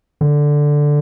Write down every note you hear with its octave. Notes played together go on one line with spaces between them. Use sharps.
D3